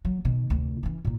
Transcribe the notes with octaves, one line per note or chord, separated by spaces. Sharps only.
F#3
B2 D#3
F1 D2
E3 C#4
A#2 D#4